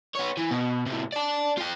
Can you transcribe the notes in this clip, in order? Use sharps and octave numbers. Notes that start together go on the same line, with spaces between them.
B3 C#5
E3
B2
A2 C3
D5 A5
F4 G5